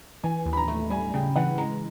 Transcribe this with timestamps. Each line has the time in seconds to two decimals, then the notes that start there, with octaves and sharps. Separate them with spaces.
0.23 E3 G#5
0.46 D#2
0.53 B5
0.57 A#5
0.68 A3
0.90 G3 G#5
1.14 C#3 G5
1.36 E3 F#5
1.58 G#3 A#5